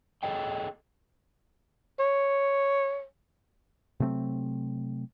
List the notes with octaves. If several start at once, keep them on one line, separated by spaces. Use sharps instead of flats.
G#4 A4 C#5 D#5 G5
C#5
C3 F#3 A3 C4